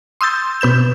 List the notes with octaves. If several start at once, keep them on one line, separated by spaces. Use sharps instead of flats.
C6 D#6 E6 G6 A6
B2 B4 G6 E7